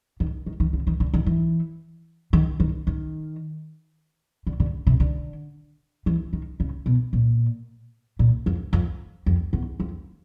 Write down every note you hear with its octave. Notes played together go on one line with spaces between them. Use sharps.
D#3
D#3
D#3
C#3
D#3
D3
D#3
E3
D#3
D#3
D#3
D3
D3
C3
D3
E3
D#3
C#3
B2
A#2
A#2
F2
F2
F2
E2
F2